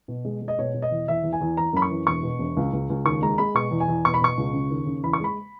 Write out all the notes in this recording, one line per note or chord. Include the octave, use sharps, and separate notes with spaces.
B2
G#3
G#3
D#5
B2 C#5
B2
D#5
E2
E2 E5
E2
G#5
E2
E3 A#5
F#2 B5
C#6
E3
E1 C#6
B2
E1
C#2
C#2
C#2
D#2 C#6
G#3 A#5
G#3 B5
B2 C#6
E2
G#5
E2
B2 C#6
B5
B2 C#6
C#2
C#3
D#2
C#3
E2 B5
C#6
G#3 B5